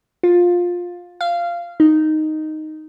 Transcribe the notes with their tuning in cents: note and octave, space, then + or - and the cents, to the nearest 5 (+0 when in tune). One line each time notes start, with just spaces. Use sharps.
F4 +15
F5 -15
D#4 -5